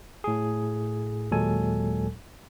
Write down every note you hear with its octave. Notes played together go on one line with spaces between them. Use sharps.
A2 G#4
D#2 A#2 F#3 G#3 A4 G#5